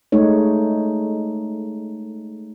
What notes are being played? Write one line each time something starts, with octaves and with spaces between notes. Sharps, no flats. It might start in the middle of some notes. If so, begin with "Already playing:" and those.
G#3 A3 D#4 C#5